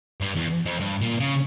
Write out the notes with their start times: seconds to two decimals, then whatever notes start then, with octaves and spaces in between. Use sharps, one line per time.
0.21 G2
0.35 E2
0.66 F2
0.80 G2
1.01 A#2
1.20 C#3